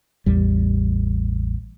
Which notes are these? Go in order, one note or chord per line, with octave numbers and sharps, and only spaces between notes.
A1 E2 G3